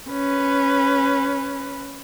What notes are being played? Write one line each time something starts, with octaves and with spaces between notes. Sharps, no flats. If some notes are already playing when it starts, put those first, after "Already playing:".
C#4 B4